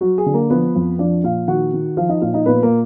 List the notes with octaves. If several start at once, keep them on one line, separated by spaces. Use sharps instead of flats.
F#3 F#4
G#4
D3
A#3 A#4
F3 B3 B4
F2
F3 D4 D5
A#2 F4 F5
D#3 F#4 F#5
D#3
F3 F4 F5
D#4 D#5
A#2 F4 F5
D#4 D#5
A#2 B3 B4
A#3 A#4